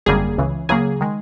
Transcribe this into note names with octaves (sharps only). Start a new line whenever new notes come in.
G#1 F#2 D3 G3 A#3 G#4
C#2 C#3 E3
C#2 C#3 F#3 A#3 G#4
D#3 G#3